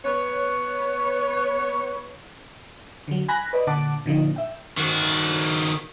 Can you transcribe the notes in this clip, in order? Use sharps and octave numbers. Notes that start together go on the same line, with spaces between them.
B3 B4 C#5
D3 F#3
G#5 B5 F#6 A#6
B4 D5 D#5 B5
A#2 D3 F#5 A5 D6
A#2 D3 F3 D#4
E5 G5
D#3 F#4